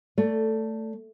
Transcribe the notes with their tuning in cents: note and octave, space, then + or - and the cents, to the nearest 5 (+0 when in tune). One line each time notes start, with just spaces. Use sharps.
A3 +10 D5 -20